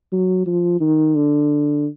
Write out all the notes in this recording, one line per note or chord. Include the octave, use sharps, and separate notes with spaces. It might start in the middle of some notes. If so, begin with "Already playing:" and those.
F#3
F3
D#3
D3